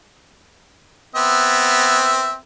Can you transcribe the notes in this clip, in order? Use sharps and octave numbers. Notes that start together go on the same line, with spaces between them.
B3 C4 E5